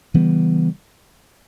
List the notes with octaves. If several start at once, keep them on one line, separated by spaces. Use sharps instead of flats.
C#3 E3 G3 B3